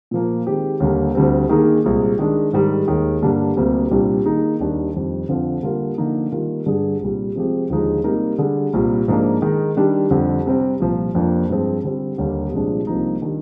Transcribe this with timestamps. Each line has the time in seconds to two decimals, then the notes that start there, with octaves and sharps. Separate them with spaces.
0.11 A#2 F3 A#3
0.47 D#3 G#3 C4 G4
0.80 D#2 D3 G3 A#3
1.15 D2 D3 G3 C4
1.49 D#3 A#3 D#4 G#4
1.84 C2 A#2 G#3
2.19 D#3 G#3 D4
2.53 G#2 D#3 G3
2.88 D#2 D#3 G#3
3.22 G2 D3 G3 A#3 D4
3.57 D2 C3 G3 A#3
3.91 C2 A#2 G3 D4 G4
4.25 D#3 A#3 D#4 G#4
4.60 D#2 D#3 G3 D4
4.94 F2 D#3 G3
5.29 F2 D3 F3 C4 F4
5.63 D3 G3 A#3 F4 A#4
5.98 D3 F3 A#3 D#4
6.32 D#3 G3 A#3 F4 A#4
6.66 G2 D3 G3 D4 G#4
7.00 C2 A#2 G3
7.35 C3 F3 G#3 C4 G4
7.70 D#2 D3 F3 G#3 D#4
8.04 C3 G3 A#3 D#4 A#4
8.38 D3 G3 D4 G#4
8.73 C2 A#2 G3
9.08 G#2 F3 A#3 D4
9.42 D#3 G#3 D#4
9.77 D#3 G3 D4 G4
10.11 F2 D3 G3
10.46 C3 G3 C4
10.80 C2 A#2 F3
11.15 F2 C3 F3 A#3 D4
11.50 G2 F3 G#3 C4
11.84 D3 G3 C4
12.18 D#2 D3 G3 A#3
12.52 C2 A#2 F3 G#3 D4
12.87 C2 C3 F3 A#3 D#4
13.22 D#3 G3 D4